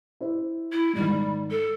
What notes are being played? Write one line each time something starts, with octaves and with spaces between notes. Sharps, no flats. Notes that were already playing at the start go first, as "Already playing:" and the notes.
E4 C5
E4
G#2 D#3 G3
A4